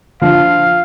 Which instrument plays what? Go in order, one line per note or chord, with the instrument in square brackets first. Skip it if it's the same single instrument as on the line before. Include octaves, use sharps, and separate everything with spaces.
[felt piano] F3 D4 F4 [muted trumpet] F5